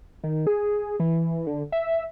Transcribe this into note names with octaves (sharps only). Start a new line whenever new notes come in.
D#3
G#4
E3
D3
E5